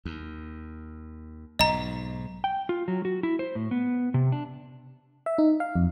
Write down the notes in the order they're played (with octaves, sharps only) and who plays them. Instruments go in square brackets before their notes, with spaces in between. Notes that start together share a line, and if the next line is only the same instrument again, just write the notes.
[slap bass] D#2
[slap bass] B1 G#2 [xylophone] D#5 A#5
[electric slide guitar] G5
F4
F#3
F#4
E4
C5
A2
B3
C3
D4
[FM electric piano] E5
D#4
F5
F2